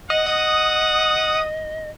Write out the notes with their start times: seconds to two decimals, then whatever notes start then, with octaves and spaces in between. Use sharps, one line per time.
0.10 D#5 F#5
0.26 D#5 D#6